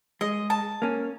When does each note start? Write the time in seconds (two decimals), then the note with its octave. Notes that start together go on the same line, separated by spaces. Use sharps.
0.21 G#3 D#5
0.50 A5
0.82 A#3 C#4